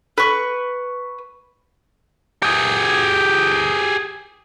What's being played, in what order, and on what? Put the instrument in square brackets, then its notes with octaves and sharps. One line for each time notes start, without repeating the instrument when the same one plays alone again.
[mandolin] B4 C#6
[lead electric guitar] G4 G#4